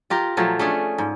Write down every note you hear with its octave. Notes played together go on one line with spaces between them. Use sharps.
F4 G4 A#4
A#2 F3 F#3 A3
A3 C#4 D4 G#4
G#2